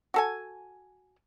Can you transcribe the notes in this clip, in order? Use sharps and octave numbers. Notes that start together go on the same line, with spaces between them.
F#4 A4 G#5